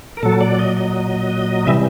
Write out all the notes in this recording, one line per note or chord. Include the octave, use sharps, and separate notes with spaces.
A#4
A#2 F#3 A4
D5
D#5
D#5
C3 E3 G3 E5